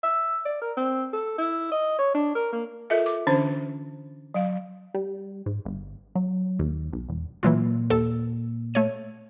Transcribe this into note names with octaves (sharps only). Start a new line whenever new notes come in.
E5
D5
A#4
C4
A4
E4
D#5
C#5
D4
A#4
A#3
F4 A4 A#4 D#5 E5
D6
D3 E3 C#4 D4 C5
F#3 F5
G3
G#2
G1
F#3
D#2
B1
E1
A#2 E3 F#3 F4
D#2 A4
A3 C#5 D#7